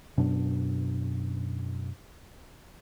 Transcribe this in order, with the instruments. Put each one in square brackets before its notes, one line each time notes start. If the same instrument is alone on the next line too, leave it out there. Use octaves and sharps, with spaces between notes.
[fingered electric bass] F#2 B2 D4